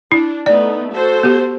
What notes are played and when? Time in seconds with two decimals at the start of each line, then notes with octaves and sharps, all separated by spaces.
0.12 D4 E4
0.46 A3 B3 D#4 D5
0.90 F#4 A4 C5
1.23 B3 G4